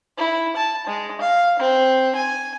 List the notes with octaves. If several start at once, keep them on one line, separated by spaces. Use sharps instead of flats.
E4
A5
G#3
F5
C4
G#5